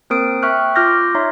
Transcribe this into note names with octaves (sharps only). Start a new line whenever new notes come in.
A#3 C4 A#4 C5 D#6 D7
E5 G5 C#6 F6 F#6
F4 D6 F6 G6 A#6
D#4 C#5 E5 A#5 C6